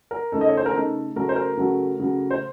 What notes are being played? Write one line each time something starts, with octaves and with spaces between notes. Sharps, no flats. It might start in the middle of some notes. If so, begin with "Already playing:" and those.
A#4
C#3 A3 D#4 A4
D#5
C#5
C5
A#4
C#3 A3 D#4 A4
C#3 F#3 A3 A#4
C5
A#4
C#3 F#3 A3
C#3 F#3 A3
C5